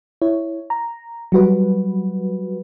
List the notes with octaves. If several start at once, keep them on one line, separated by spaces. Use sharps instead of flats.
E4 C#5
A#5
F#3 G3 F#4 B4